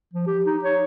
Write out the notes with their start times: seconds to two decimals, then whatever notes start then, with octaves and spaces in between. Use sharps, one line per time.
0.14 F3
0.27 G4
0.46 D#4
0.64 C#5